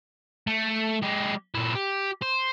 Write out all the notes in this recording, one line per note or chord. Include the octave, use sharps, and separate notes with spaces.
A3
G#3 G4
A#2 E4
G4
C5